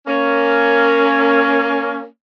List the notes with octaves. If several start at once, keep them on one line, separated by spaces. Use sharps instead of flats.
A#3 C#4